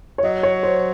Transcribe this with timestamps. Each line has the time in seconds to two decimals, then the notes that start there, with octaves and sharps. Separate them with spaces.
0.18 C#5
0.23 F#3 D#5
0.43 C#5
0.63 C5